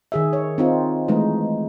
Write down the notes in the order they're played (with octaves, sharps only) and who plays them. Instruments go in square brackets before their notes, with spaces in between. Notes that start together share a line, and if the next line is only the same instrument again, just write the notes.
[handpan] D#3 G#4 E5
C#5
C4 D#4 F4
E3 G#3 A3 D#4